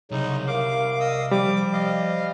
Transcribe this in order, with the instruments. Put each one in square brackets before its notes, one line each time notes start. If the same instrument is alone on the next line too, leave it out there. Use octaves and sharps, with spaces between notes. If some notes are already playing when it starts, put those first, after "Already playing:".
[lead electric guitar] C2 [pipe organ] C#3 F#3 [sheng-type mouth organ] D#4
[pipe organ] A#4 F5 [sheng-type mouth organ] D6
[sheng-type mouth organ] D#5 D#6 E6
[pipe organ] F3 [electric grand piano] G3 [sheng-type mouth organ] D6
[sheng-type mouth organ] D#5 F5